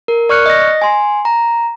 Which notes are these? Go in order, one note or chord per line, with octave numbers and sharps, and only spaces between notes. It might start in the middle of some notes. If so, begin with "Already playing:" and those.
A#4
D5 C#6 F6 F#6 C#7
D#5 A#6
G#5 C6
A#5